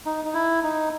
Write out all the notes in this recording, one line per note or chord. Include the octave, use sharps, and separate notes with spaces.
D#4
D#4
E4
D#4